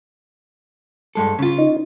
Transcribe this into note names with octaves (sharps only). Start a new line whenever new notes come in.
G2 G#3 A4
C#3 F4
D#4